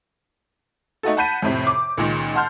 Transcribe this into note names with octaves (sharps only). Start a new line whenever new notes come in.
A3 D#4 F#4 A4
F#5 A5 B5 G6 B6 D#7
F2 A2 C3
D6
C#2 A#2 D#3
F#5 A5 C6 F6 G6